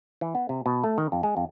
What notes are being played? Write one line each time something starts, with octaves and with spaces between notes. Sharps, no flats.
E3
B3
C3
B2
A3
D#3
F2
G#3
F2